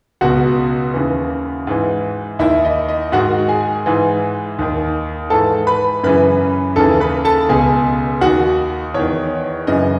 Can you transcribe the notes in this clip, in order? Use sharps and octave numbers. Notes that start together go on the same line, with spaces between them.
C#2 B2 F#4 F#5
D#2 C#3 E3
G#2 E3
D#2 D#3 E4 E5
D#5
D#5
G#2 D#3 F#4 F#5
G#4 G#5
G#2 E3
D#2 D#3
G#2 E3 A4 A5
B4 B5
F#2 C#3 E3 B4 B5
D#2 C#3 E3 A4 A5
B4 B5
A4 A5
C#2 B2 G#4 G#5
D#2 D#3 F#4 F#5
E2 D#3 C#5
F#2 C#3 E3 D#5